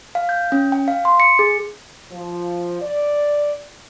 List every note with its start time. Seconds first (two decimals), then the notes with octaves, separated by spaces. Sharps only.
0.15 F5
0.29 G6
0.52 C#4
0.72 G5
0.88 F5
1.05 C6
1.20 C#7
1.39 G#4
2.11 F3
2.81 D5